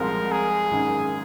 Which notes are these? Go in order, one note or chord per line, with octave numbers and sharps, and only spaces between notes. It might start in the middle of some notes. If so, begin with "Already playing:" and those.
Already playing: C2 A#2 F3 G#3 C4 A#4
G#4
G#1 F#2 D#3